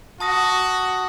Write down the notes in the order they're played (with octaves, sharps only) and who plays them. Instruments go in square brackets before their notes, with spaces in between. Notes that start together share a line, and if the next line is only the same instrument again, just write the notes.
[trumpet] F#4 [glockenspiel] A5 D#6 A#6